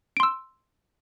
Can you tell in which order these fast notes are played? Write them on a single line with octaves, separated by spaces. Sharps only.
D7 C6 E6